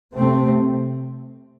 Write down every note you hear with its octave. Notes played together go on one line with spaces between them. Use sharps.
C3 A3 C4